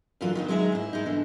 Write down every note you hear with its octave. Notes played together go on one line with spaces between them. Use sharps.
F#2 D3 E3 F#3 F4 A4
D#3 B3 C4
F#3 G#3 C4 D#4 G#4 E5
G#2 E4
G#3 D#4
B2 D3 E3